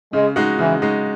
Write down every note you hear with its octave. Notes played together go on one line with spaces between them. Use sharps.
C#3 G#3
G#3 D#4 F#4
C#3 E3
G#3 D#4 F#4